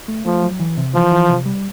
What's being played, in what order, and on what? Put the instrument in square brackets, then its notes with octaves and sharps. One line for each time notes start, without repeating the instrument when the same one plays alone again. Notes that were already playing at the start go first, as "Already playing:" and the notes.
[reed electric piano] A3
[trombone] F3 [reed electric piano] A3
[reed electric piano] F#3
E3
C3
[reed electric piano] E3 [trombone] F3
[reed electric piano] E3
C3
G3